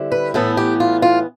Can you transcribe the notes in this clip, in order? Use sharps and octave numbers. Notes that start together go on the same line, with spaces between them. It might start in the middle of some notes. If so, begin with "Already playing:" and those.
Already playing: D3 G3 C4 E4
B4
A2 E3 B3 A4
G4
F4
F4